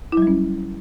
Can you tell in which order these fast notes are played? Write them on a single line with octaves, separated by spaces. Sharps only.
E4 F#3 G3 C#4